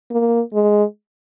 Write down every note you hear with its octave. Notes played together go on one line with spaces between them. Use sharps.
A#3
G#3